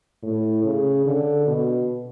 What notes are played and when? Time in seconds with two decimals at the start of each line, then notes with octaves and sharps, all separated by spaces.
0.23 A2
0.64 C#3
1.06 D3
1.47 B2